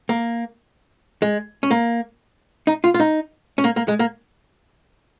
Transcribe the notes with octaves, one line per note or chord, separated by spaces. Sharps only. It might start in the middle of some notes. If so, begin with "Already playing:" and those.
A#3
G#3
C#4
A#3
D#4
F4
F4
D#4
C#4
A#3
A#3
G#3
A#3